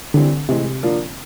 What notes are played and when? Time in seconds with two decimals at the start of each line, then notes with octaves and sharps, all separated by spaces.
0.14 D3 E3 G3 C4
0.49 A2 C3 E3 G#3 C4
0.83 D3 F3 A#3 D4 F4